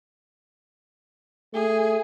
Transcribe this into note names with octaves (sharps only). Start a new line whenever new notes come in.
A3 G#4